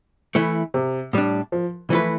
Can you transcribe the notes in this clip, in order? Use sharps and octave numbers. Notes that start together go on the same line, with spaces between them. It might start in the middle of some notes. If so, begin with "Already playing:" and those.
E3 A3 E4
C3
A2 G3 D4
F3
E3 F3 A3 E4 B4